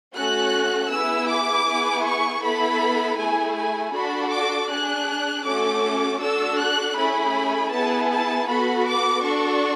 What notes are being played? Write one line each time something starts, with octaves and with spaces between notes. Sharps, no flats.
A3 C#4 F#4 A4 F#6
B3 E4 G#4 E6
D6
B3 E4 G#4
C#6
B3 E4 A4 B5
A3 E4 G#4 G#5
G#5
D4 F#4 A4 B5
D6
D4 G#4 F#6
A3 C#4 F#4 A4 D6
D4 F#4 A4 E6
F#6
A3 C#4 E4 G#4 B5
B3 E4 G#4 A5
A5
B3 F#4 A4 B5
D6
D4 F#4 A4 C#6